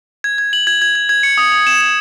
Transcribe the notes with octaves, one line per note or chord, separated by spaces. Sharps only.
G#6
G#6
F#7
G#6
G#6
G#6
G#6
C#7
D#6
D#6
E7
E7